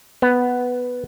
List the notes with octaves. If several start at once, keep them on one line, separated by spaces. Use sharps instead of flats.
B3